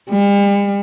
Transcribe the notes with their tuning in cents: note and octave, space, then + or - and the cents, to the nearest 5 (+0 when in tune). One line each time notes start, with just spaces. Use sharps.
G3 +45